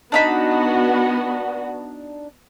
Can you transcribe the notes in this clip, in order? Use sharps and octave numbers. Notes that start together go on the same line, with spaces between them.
B3 D4 D#4 F#4 B5